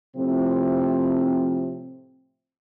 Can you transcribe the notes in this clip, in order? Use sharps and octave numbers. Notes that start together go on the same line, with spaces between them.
A2 C3 F3 C4